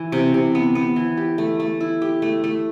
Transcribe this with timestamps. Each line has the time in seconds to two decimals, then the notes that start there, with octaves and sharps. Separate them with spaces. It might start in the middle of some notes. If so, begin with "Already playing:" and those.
Already playing: E3
0.12 C3
0.34 C3
0.55 B3
0.75 B3
0.96 E3
1.17 G4
1.38 A3
1.60 A3
1.81 E4
2.02 G4
2.22 A3
2.44 A3